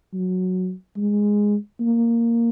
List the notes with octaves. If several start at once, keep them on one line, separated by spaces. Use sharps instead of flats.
F#3
G#3
A#3